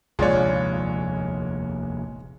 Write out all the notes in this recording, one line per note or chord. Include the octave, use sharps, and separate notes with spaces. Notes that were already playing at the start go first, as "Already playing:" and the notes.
F1 A#1 D#2 G#3 F4 C#5 D5